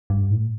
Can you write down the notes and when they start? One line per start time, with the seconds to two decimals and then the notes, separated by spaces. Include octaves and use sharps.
0.10 G2
0.30 A2